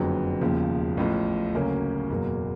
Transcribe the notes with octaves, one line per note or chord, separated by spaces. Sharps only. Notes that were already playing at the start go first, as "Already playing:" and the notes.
Already playing: F#1 F2 D3 F#3 B3
E1 D#2 C#3 F3
A1 A2 F3
D2 C#3 F#3 A#3 C#4
F#1 E2 B2 F#3 A#3